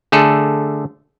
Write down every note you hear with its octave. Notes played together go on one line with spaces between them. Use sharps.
D3 A3 G#4 A4